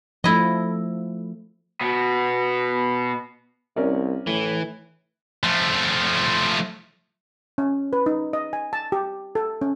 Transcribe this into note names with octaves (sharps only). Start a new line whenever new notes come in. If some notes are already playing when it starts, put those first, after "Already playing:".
F3 A3 E4 D#5
B2 B3
C2 C#4 A#4 D5
A2 E3
F3 A3
C#4
B4
D#4
D#5
G#5
A5
G4
A4
C#4